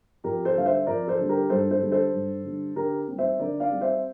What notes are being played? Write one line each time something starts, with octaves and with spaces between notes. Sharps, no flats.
F2 G4 A#4
A4 C5
D3 G3 F5
C5 E5
F2 A#4 D5
A4 C5
D3 G3
G4 A#4
G2 A4 C5
A4 C5
D3 G3
A4 C5
G2
D3 G3
D3 G4 A#4
G3 C4
C5 E5
D3 A#4 D5
D5 F5
G3 C4
C5 E5